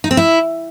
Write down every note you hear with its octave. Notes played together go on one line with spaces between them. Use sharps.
D#4
C4
E4